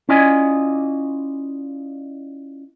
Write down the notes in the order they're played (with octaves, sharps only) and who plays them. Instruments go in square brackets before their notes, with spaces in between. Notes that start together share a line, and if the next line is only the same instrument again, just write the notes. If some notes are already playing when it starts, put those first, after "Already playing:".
[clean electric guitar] C#4 E4 F4 D5 D#5 G#5